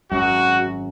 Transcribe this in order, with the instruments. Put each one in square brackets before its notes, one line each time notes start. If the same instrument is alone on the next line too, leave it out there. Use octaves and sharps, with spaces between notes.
[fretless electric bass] G#1 F#2 [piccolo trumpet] F#4